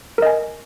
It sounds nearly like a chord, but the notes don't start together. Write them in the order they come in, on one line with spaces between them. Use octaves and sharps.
A#4 D#5 G#5